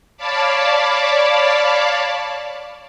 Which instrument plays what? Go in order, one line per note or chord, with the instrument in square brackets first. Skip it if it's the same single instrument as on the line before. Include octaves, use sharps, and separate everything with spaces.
[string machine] C#5 D5 F5 A5 B5 D6